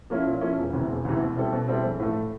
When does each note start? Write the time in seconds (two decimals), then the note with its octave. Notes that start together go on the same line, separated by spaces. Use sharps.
0.10 F3 A#3 C#4 E4
0.26 A#2
0.41 F3 A#3 C#4 E4
0.58 E1
0.73 D2 C3 E3
0.89 E1
1.05 D2 C3 E3
1.21 B2
1.37 G3 C4 E4 A4
1.53 B2
1.68 G3 C4 E4 A4
1.84 A#1
2.00 A2 E3 A3